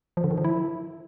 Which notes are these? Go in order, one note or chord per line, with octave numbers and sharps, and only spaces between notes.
F3
D3
D#3
F3
E4